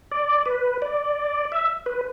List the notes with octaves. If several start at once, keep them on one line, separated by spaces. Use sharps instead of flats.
D5
B4
D5
E5
B4